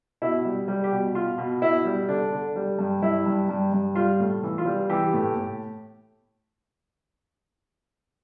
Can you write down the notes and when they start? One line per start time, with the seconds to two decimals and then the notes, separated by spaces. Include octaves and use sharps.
0.22 B2 E4
0.45 G3
0.68 G3
0.84 G4
0.92 B2
1.15 B2 F4
1.38 B2
1.62 B2 E4
1.85 G3
2.09 D3 D4
2.32 D3
2.56 G3
2.79 G2
3.02 G2 E4
3.26 G2
3.49 G2
3.73 G2
3.95 G3 F4
4.20 A2
4.43 E3
4.58 F4
4.66 G3
4.90 E3 G4
5.14 A2
5.37 A2